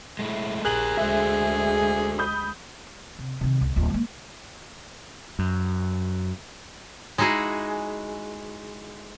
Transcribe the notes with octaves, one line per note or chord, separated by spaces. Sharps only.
G#3 A3 E4
A#1 G4 G#4 A#4 F#6 F#7
D2 G#3 F#4 A4 C5 E5
B5 D#6 G6
C3
C3 D#3
C#2 G2
D1 F4
G#3 A#3
F#2
G#3 D#4 E4 F#4 G#4